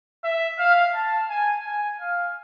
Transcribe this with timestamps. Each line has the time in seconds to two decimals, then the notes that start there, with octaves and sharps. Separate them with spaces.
0.24 E5
0.59 F5
0.95 A5
1.30 G#5
1.66 G#5
2.01 F5